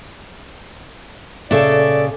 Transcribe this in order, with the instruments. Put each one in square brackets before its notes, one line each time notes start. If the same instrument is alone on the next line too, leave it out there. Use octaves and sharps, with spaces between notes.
[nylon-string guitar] A#2 C#3 [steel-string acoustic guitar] A4 E5 [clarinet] D5